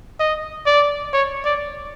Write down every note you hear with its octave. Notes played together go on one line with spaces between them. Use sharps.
D#5
D5
C#5
D5